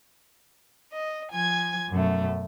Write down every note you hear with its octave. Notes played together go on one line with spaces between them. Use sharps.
D#5
F3 G#5 G#6
F#2 B2 A3